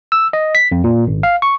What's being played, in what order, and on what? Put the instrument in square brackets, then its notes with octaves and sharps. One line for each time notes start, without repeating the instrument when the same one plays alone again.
[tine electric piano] E6
D#5
B6
F2
A#2
G#1
F5
C#6